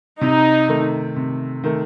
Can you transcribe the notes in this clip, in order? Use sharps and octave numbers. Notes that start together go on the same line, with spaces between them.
C3 D#4
D#3 A3
C3
D#3 A3